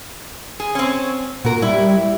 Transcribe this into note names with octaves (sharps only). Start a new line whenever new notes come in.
G#4
C4 C#4
A#2 F#4 A#4
G3 E4